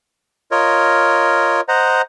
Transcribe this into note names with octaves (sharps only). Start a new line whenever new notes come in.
F4 A#4 C#5 D#5
C5 D#5 F#5 A#5